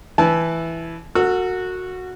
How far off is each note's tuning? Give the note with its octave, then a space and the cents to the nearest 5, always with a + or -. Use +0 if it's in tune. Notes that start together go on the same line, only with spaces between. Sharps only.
E3 +0 E4 +0 A5 -30
F#4 -10 A#4 -45 E6 +0